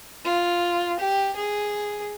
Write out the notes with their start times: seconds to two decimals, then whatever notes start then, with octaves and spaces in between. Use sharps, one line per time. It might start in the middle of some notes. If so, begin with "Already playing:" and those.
0.25 F4
0.99 G4
1.36 G#4